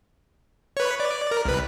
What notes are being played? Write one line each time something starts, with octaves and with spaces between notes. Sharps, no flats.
B4 C#5
D5
A#4
C2 B4